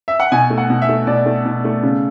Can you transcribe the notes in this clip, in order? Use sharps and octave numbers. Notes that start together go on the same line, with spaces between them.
E5
F#5
B2 G#5
A3
F#5
B2
E5
A3
B2 D5
A3
B2
A3
C#3